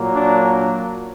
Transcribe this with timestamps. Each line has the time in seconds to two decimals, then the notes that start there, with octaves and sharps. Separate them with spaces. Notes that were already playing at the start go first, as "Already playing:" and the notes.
Already playing: A#2 F#3 A#3
0.14 D4